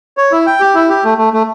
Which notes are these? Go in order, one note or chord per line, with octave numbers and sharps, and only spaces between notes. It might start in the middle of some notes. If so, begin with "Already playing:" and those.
C#5
E4
G5
G4
E4
G4
A3
A3
A3